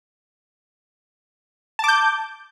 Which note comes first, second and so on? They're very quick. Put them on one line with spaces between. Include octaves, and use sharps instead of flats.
A5 D6 G6